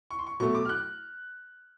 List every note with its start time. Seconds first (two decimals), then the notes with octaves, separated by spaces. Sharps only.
0.11 C#6
0.19 C6
0.27 C#6
0.40 B2 F#3 A3 C#6
0.55 D6
0.65 F6
0.69 F#6